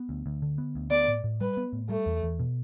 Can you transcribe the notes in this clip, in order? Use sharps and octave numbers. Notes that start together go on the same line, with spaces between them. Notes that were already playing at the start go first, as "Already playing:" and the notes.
Already playing: B3
D2
D2
D3
B3
D2
B3 D5
A2
A2
G3 B4
B3
A2
G3 A3
E2
E2
B2